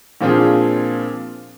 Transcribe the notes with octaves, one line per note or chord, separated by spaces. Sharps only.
A#2 F3 C4 D4 F4 G#4